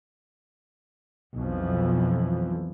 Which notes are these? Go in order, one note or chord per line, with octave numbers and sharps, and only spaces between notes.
B1 F2 E3 F3